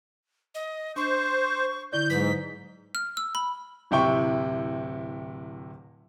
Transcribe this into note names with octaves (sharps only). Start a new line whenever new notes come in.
D#5
D4 C5 C#6
D3 E4 D5 G6
G#2 F#3 B4 B6
F6
E6
B5
D1 C3 E4 G5 C#6